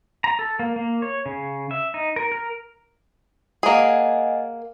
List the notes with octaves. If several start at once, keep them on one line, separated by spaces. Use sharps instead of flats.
A#5
A4
A#3
A#3
C#5
C#3
E5
D#4
A#4
A#4
A#3 G#4 D#5 F#5 G#5